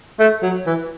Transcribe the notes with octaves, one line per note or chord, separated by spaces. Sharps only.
A3
F#3
E3